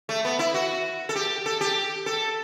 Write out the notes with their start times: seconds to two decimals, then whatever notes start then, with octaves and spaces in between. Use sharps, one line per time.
0.09 A3
0.25 B3
0.39 E4
0.54 F#4
1.09 A4
1.15 G4
1.46 A4
1.61 G4
2.06 A4